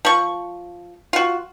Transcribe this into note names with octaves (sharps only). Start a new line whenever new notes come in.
F3 C#6
F4 F#4